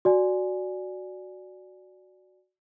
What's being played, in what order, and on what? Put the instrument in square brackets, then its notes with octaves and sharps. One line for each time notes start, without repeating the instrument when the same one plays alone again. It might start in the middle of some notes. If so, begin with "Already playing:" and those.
[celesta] F#4 D5 G#5